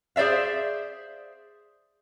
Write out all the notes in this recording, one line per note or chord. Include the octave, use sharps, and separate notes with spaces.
G#4 C5 D5 E5 F5